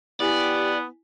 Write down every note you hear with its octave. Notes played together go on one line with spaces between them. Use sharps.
B3 E4 G4 D5 G#5 B6